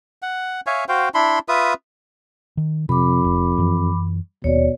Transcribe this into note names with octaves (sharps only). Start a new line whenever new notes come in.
F#5
C#5 E5 F5 G#5
F#4 C5 F5 G5
D4 E4 B5 C6
F4 B4 E5 D#6
D#3
F2 C3 B5 D6
F1
F#2 E3
D#1 D#2 B2 C#5 D5